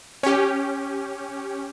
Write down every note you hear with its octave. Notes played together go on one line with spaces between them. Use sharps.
C#4 G4